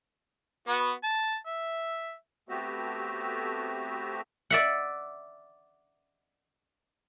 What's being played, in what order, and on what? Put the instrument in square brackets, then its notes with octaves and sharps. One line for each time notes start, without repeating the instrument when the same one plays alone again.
[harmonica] B3 F#4
A5
E5
[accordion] A3 B3 C4 F#4 G4
[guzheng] D5 E5 F#5